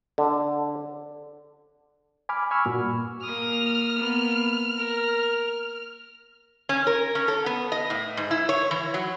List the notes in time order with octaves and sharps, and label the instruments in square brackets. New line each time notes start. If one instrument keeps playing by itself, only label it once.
[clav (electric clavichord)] D3
[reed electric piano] G#5 B5 D6 F6
G#5 B5 C#6 E6 F6
G2 A#2 F#4
[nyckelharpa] A#3 D#6 [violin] F6
[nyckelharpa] A#3 B3
A#4
[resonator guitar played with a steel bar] C#4
A#4
C#4
A4
B3
D#5
A2
G#2
E4
C#5
E3
F#3